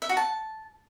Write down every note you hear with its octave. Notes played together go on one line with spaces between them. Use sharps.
E5
F#4
A5